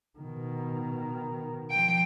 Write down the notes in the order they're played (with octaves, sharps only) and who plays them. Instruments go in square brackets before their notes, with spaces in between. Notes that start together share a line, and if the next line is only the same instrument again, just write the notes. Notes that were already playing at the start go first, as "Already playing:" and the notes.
[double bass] B2 D#3
[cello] F3 G5